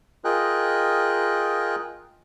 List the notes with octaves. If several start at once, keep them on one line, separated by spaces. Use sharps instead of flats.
F4 G#4 A#4 D#5 G5 F#6